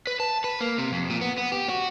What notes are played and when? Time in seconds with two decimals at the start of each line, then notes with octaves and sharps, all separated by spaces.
0.07 B4
0.20 A5
0.44 B4
0.60 A#3
0.78 C3
0.92 F2
1.10 A#2
1.21 B3
1.38 B3
1.52 G4
1.69 F#4